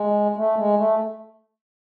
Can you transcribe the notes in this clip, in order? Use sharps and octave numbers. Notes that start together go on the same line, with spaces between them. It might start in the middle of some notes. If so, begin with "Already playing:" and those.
Already playing: G#3
A3
G#3
A3